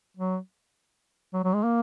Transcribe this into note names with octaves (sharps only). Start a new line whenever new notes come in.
F#3
F#3
F#3
G#3
A#3